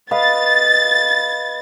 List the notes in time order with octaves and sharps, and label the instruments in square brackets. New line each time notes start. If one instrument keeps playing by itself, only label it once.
[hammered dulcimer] B4 D#5 F5 [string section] A6